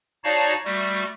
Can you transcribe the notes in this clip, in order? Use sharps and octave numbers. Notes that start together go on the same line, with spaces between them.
D#4 F#4 C#5 D5 F5 A5
G3 A3 F#4